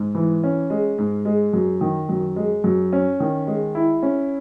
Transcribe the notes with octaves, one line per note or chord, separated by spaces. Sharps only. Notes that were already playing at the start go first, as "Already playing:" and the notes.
Already playing: G#2
E3
C#4
G#3
G#2
G#3
F#2
D#3
F#2
G#3
F#2
C#4
D#3
G#3
E4
C#4